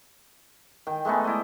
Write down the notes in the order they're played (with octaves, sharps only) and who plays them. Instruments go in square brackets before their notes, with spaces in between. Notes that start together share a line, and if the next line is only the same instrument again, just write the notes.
[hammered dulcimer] D#3 G5
G#3 A3 B3 D#4
E4 D5 D#5